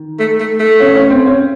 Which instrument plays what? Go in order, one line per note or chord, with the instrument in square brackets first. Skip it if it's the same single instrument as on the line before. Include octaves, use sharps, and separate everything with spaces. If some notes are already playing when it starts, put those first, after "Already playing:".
Already playing: [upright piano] D#3
[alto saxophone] A3
A3
A3
[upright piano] C#4
C#4
C4
C#4